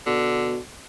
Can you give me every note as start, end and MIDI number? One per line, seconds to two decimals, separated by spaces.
0.06 0.58 47
0.06 0.62 50